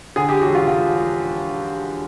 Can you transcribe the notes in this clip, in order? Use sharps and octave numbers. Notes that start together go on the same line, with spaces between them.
D3 G#4
G4
E1 F#4
F4
E1 F4
F3